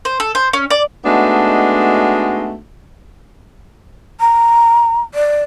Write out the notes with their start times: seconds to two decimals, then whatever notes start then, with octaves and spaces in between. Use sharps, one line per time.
0.05 C5
0.20 A4
0.35 C5
0.53 C#4
0.70 D5
1.05 G#3 A3 B3 D4 D#4 F#4
4.20 A#5
5.14 D5